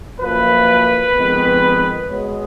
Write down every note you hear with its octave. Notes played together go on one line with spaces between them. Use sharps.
F#2 F3 A#3 B4
F2 D#3 G#3 B3
B2 G#3 B3 C#5